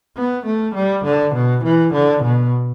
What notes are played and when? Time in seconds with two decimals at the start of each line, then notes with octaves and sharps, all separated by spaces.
0.17 B3
0.46 A3
0.75 G3
1.05 D3
1.35 B2
1.64 E3
1.94 D3
2.23 B2